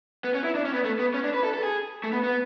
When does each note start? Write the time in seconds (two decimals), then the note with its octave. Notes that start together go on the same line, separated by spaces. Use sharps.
0.24 B3
0.34 C#4
0.44 E4
0.55 D4
0.65 C#4
0.74 B3
0.85 A3
0.99 B3
1.14 C#4
1.24 D4
1.34 B4
1.44 A4
1.54 A4
1.63 G#4
2.04 A3
2.13 B3
2.24 B3